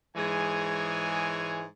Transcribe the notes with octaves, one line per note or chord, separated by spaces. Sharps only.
G#2 E3 G#3 G#4 C#5 G#5